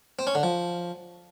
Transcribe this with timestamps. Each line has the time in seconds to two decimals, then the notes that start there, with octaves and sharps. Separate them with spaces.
0.19 C4
0.27 C#4
0.35 D3
0.43 F3